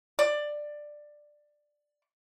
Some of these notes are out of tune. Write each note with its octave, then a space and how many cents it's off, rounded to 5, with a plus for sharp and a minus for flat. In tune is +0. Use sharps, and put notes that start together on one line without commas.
D5 +10